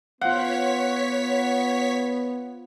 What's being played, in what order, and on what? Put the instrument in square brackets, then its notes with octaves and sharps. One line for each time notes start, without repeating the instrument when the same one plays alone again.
[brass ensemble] B3 [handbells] F4 C5 F5 [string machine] C#5 B6 [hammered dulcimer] F#5